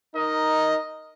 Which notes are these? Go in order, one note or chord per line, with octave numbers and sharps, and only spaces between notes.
D#4 A#4 D#5